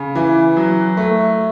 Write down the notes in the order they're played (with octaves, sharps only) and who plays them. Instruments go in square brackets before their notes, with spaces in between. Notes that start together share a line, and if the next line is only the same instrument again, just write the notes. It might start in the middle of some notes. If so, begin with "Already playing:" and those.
Already playing: [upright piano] C#3
E3
F#3
A3